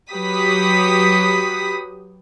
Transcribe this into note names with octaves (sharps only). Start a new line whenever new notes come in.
F#3 G4 B4 D#6 B6